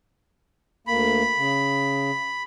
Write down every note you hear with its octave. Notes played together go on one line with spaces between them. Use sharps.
D2 A#3 B5
C#3